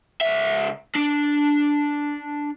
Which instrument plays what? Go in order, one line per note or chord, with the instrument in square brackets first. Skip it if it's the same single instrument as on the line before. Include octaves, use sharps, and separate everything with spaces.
[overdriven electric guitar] C#2 E5
D4